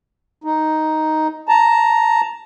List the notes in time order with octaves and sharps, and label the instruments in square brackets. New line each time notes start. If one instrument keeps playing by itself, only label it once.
[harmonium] D#4
A5 A#5